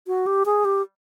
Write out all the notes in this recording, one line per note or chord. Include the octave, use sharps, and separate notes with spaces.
F#4
G4
G#4
G4